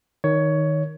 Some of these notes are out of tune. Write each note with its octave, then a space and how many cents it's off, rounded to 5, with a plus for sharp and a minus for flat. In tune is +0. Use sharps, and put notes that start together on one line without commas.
D#3 +0 C#5 +15